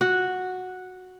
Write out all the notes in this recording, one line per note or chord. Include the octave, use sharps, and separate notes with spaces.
F#4